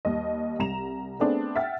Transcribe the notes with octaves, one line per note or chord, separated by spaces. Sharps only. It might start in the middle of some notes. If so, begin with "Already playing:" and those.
D#2 G3 D#5
C2 G3 A#5 E7 F7
A3 B3 C4 D4 G#4
E5 F#5 G5 F6 A6